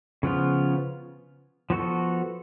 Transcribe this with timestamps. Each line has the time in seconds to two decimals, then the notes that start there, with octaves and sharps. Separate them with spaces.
0.23 C#3 F3 B3 F4
1.70 F3 B3 F#4 A4